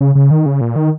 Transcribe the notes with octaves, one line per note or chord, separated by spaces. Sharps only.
C#3
C#3
D#3
C#3
A#2
D#3